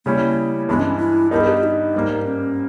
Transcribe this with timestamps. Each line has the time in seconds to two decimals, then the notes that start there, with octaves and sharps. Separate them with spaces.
0.06 C#3 G3 A#3 C#4 E4
0.69 G2 E3 G#3 B3
0.80 C#4
0.99 E4
1.31 G2 G3 B3 D#4 A#4
1.41 G#4
1.48 G4
1.63 D#4
1.94 G#2 G3 A#3
2.26 C#4